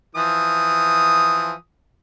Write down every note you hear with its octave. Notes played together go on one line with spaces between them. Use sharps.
E3 F3 D#6